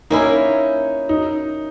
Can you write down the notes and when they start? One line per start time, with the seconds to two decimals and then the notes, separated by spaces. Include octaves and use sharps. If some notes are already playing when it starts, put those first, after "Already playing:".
0.10 A#3 C#4 D#4 E4
1.09 D#4